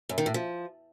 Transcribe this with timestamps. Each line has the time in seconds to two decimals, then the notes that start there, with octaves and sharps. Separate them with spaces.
0.09 F#2
0.18 D#3
0.26 A2
0.34 F3